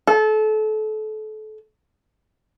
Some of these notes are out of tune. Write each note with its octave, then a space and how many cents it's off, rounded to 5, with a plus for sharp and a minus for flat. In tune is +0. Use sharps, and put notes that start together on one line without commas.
A4 -30